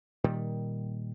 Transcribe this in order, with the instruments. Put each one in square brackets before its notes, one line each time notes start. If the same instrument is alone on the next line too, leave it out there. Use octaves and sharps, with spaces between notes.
[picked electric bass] A#2 D#3 G3